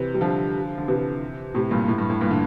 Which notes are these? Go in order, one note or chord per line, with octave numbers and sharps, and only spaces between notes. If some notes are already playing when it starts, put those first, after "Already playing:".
Already playing: C3 E3
G3
D3 F3
D3
C3 E3
A2 C3
G2 A#2
A2
G2
A2
G2 A#2
D3